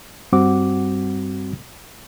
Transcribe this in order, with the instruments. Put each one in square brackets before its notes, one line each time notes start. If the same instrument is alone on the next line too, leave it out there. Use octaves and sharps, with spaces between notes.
[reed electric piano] G2 G3 C4 F#4 F#5 D6